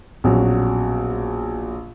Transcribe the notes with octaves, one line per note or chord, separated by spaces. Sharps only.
A#1 B2 F#3 C#4